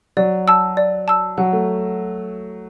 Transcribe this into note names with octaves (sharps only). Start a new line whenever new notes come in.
F#3 D5
A5 E6
D5
A5 E6
F#3 F#5
A3